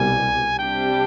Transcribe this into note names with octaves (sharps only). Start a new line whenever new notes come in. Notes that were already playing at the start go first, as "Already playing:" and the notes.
Already playing: C2 B2 G3 G#5
C3 G3 D4 G4 G5